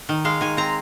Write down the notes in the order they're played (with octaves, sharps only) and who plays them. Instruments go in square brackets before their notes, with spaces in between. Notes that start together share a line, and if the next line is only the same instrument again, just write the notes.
[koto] D#3
G#3 F5
D#3 G#5
C4 A#5